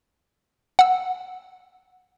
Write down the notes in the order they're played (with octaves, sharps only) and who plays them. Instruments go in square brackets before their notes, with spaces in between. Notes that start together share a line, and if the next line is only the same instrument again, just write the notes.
[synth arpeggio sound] F#5 E6